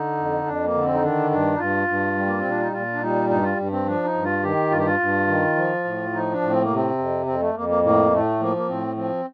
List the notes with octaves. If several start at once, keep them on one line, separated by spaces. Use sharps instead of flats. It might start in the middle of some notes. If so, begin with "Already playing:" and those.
Already playing: D3 D#4
F2
F2 D4
A#3
D3
C4
D#4
D#3 D4
G2 D4
D#4
G2 F4
G2
G3
A#3
C4
A#2 D4
D#4
A#2 F4
D4
G3 D#4
G2 D#4
F4
G2
C4
F3 D4
D#4
G2
F4
D#3 G4
G2 F4
G4
F4
G2
D#3
F3
A2
F3 D#4
D4
A2
C4
A#3
C3
C4
F2
F2 C4
A3
F2 A#3
A#3
A2 A#3
A2 A3
F3 A#3
A#3
A2 C4
F3 C4